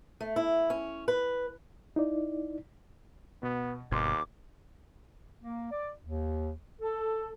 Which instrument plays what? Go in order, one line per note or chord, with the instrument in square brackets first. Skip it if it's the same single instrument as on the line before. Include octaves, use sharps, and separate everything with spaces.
[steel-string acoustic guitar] A3
E4
C#4
B4
[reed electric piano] D#4 E4 D5
[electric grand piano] B2 [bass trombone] B3
[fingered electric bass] G1 B2 [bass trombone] D#2 [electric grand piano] C6 F6 G#6 [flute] D6
[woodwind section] A#3
D5
D#2
A4